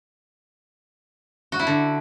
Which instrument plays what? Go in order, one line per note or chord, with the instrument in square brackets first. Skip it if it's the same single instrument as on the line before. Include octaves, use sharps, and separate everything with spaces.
[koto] F#4
E4
D3